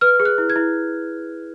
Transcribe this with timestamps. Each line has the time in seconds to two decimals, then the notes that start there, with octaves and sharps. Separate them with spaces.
0.01 B4 F6
0.20 G#4
0.25 F#6
0.38 E4
0.50 G#6
0.56 E4